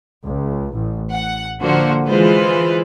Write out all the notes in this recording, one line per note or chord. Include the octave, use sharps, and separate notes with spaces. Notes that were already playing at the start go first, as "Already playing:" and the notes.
C#2
A1
F#5
D3 F3 A#3 F#4 C5
E3 G#3 F4 B4 C5